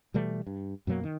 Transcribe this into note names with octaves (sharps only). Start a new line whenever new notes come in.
B2 E3 G3 A3
G2
F#2 B2 F#3 A#3
D#3